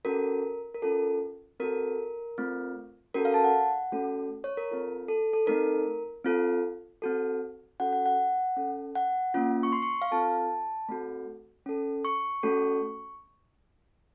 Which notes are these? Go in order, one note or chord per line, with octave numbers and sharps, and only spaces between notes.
C#4 F#4 A4 A#4
A#4
C#4 F4 A4
C4 F#4 A4 A#4
A3 C4 F4
C#4 F#4 A4 A#4
F5
A5
F#5
A3 C#4 F#4 A4
C#5
A#4
C4 F4 A4
A4
A4
A3 C4 D#4 A4 A#4
C4 F4 A4
C4 F#4 A4
C#4 F#4 A4 F#5
F#5
F#5
C#4 A4
F#5
A#3 C#4 F4
C#6
C6
C#6
F5
C4 F4 A4 A5
A3 C4 F#4 A4
C#4 A4
C#6
A3 C#4 F#4 A4